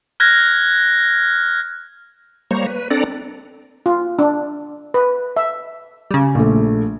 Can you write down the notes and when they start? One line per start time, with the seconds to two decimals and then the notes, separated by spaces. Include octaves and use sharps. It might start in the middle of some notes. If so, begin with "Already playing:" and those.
0.20 F6 F#6 G#6 A#6
2.51 G3 A#3 C5 C#5 A#5 C#6
2.67 B4
2.90 C4 D4 A4 D5 A#5
3.86 F4
4.19 D4
4.94 B4
5.36 E5
6.11 C#3 G3
6.35 A#1 A3